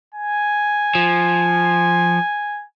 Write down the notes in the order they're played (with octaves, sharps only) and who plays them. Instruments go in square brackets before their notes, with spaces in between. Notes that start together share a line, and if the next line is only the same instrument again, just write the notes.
[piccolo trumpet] G#5
[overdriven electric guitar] F3